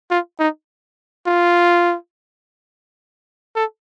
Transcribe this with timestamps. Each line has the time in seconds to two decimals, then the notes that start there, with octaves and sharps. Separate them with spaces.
0.11 F4
0.39 D#4
1.26 F4
3.56 A4